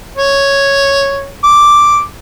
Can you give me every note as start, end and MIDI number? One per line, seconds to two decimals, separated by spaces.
0.17 1.30 73
1.44 1.99 86